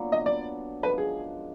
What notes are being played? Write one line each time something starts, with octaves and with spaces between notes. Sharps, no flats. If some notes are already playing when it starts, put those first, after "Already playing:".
Already playing: A#2 F#3 B3 D4
D#5
D5
F#2 F3 G#3 B4
G#4